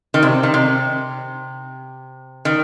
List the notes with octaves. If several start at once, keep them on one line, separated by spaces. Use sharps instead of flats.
D#3
C3
D#3
C3
D#3